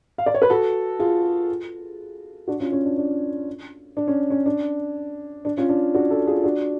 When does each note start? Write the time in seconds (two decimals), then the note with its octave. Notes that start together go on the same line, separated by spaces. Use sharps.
0.18 F5
0.26 D5
0.34 C#5
0.42 B4
0.50 F#4 A4
0.99 F4 G#4
2.48 D4 F#4
2.60 C#4 F4
2.72 C#4
2.85 D4
2.98 D4
3.97 D4
4.07 C#4
4.30 C#4
4.46 D4
5.45 D4
5.57 C#4 F4
5.69 D4
5.94 D4 F#4
6.11 F#4 A4
6.27 F4 G#4
6.44 D4 F#4